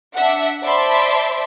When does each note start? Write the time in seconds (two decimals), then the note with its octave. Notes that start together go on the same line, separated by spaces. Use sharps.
0.14 D4 E5 F#5
0.63 C5 D5 E5 A5 B5 C6